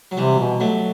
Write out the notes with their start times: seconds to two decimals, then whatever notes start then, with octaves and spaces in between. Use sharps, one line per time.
0.11 F#3
0.17 C3 E3 G3
0.39 B2
0.60 F#3 A3